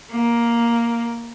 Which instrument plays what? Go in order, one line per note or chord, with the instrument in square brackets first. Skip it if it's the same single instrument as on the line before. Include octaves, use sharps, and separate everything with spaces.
[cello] A#3